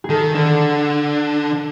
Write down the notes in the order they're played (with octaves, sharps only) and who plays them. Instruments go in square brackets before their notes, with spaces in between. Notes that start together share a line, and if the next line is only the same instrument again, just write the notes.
[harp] G#4
[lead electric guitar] D#3 [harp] A4
[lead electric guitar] D3